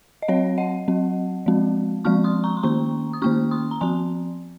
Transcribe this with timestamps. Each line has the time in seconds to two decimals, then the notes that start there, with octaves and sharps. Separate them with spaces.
0.22 D#5
0.28 F#3 C4 C#5 F5
0.58 D#5 F#5
0.88 F#3 C4
1.46 F3 G#3 C4
2.04 F3 G#3 C4 C#6 F6
2.24 C6 D#6
2.44 A#5 C#6
2.57 C6
2.63 D#3 A#3 C#4 A#5 C#6
3.13 D#6
3.22 D#3 A#3 C#4 C#6 F6
3.51 C6 D#6
3.71 A#5
3.81 F3 C4 G#5 C6